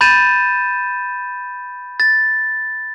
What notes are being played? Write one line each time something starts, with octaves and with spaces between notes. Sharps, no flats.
B5 G6 A6 D#7 E7
A6